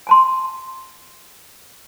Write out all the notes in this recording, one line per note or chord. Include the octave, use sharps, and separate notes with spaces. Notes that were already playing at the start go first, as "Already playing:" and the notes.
G#5 A5 C6